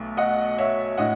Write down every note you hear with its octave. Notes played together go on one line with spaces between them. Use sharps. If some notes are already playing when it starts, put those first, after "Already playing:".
Already playing: B1 B2 A3
D#5 F#5
C#5 E5
A2 D#5 F#5